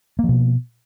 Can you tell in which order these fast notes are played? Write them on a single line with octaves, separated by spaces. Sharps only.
A#3 F3 B2